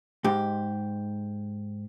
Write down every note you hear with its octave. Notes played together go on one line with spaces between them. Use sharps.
G#2 G4